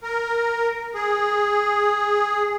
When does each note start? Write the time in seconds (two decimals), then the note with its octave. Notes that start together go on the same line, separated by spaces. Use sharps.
0.03 A#4
0.94 G#4